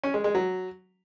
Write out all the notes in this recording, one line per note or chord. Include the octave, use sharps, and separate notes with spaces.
C#4
G#3
G#3
F#3